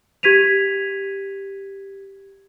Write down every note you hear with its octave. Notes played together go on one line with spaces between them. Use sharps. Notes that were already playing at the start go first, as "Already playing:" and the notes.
G4 G#6 B6 D#7 F7